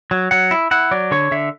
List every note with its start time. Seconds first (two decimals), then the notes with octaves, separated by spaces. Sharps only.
0.11 F#3
0.31 F#3 F#5
0.51 E4
0.71 E4 F#5
0.91 F#3 D5
1.11 D3 C#5
1.31 D3 E5